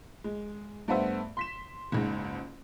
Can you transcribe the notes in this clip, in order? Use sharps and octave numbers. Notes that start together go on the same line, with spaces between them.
G#3
G2 A3 B3 C5 E5
C6 B6 E7
F#1 C#2 G#2